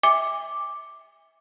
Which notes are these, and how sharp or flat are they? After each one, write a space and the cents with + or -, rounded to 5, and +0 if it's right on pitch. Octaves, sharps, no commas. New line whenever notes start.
E5 -25 G#5 -40 D6 +0